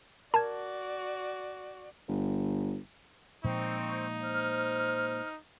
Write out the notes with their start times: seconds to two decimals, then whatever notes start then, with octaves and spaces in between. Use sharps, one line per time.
0.34 F#4 A#4 D5 A5 G#6
2.08 G1
3.44 A#2 F3 G#3 C4 D#4 C#6
4.23 C5 F6